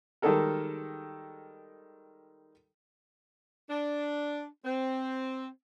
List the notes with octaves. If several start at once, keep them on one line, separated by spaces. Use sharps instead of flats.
D#3 G3 G#3 A4 A#4
D4
C4